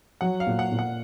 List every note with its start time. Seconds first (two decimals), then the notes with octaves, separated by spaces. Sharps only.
0.21 F#3 F#5
0.40 F5
0.47 A#2
0.59 F#5
0.72 A#2
0.79 F#5